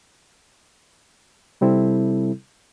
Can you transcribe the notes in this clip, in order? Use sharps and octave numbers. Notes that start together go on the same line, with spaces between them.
C3 G3 C4 E4 A4